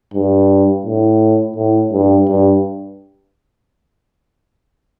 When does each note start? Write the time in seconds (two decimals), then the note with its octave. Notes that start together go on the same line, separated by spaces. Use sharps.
0.14 G2
0.86 A2
1.56 A2
1.92 G2
2.28 G2